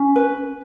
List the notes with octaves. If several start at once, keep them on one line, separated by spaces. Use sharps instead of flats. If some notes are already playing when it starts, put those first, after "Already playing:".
Already playing: C#4
B4